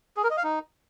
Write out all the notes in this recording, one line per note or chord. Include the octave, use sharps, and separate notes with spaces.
G#4
A#4
D#5
F5
D#4